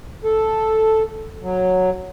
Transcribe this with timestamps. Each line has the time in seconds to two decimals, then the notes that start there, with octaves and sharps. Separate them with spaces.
0.24 A4
1.42 F#3